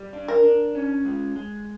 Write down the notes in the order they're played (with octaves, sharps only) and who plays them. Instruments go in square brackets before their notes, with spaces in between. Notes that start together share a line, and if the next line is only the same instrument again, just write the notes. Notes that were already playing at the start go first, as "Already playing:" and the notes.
Already playing: [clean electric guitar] G3
D4
[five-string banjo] A#4
[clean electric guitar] D4
C#4
G#3
G#3